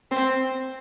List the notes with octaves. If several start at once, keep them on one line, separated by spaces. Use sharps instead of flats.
C4